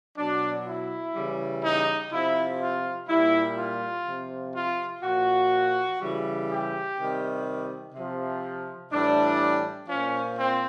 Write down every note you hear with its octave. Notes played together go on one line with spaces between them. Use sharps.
B2 F#3 D4
E4
C#3 E3 G3
D#4
C3 F3 E4
F4
A#2 G3 E4
F4
C3 F3
F4
A#2 F3 F#4
C#3 E3 G3
G4
C3 D#3 G3
C3 F3
A2 E3 G3 D4
A#2 F3 C#4
C4